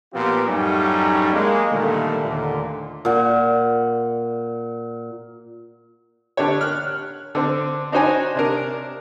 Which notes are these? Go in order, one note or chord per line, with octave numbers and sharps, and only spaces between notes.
A#2 F3 B3 C4 F4 G4
F#2 A2 G3 C#4 D#4
G#3 A#3
A#2 D3 D#3 G3 A3
D#2 A#2 D3
A#2 F#5
D3 D4 G4 C#5
F6 F#6
D3 C4
D4 D#4 F#4 C5 C#5 G#5
C3 D4 A#4